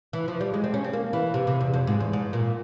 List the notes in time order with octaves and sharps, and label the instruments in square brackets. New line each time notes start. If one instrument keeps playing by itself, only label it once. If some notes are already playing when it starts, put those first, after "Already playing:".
[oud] E3
F3
G3
G#3
C4
C#4
C4
A#3
E3
C3
C3
E2
F2
G#2
E2
G#2
A#2